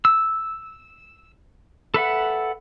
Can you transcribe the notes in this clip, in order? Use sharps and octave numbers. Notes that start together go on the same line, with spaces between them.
E6
A4 B4 E5 F#5